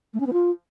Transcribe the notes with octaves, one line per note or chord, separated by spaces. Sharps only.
A3
C#4
B3
F4